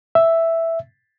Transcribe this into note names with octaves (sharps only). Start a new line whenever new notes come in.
E5